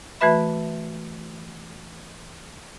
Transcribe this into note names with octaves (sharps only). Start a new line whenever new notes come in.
E3 A3 F#4 B4 E5 B5